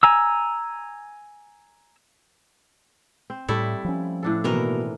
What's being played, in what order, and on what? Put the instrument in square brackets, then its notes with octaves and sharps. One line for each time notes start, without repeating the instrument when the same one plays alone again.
[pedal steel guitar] G#5 A#5 E6
[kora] C4
[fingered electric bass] A2 [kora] G3 [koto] A3 E4
[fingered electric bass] F3 C#4
[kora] A2 D4 A4
[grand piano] B2 A#3 [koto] D#3 E3 A#4